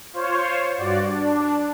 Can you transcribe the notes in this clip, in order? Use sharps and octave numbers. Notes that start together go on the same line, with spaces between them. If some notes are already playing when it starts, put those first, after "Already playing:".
F4 C5 C#5
G2 F#4 D5
D4